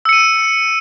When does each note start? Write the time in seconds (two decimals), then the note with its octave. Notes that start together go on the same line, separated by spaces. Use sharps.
0.05 E6
0.09 C#7
0.13 D#7